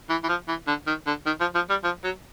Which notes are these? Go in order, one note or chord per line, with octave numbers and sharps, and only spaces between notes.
E3
E3
F3
E3
D3
D#3
D3
D#3
F3
F3
G3
F3
F#3